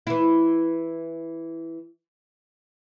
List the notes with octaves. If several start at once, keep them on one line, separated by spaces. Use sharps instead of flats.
E3 E4